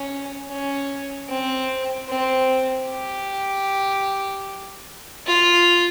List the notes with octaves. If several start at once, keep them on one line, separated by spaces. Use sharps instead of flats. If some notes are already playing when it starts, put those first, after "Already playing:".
Already playing: C#4
C#4
C4
C4
G4
F4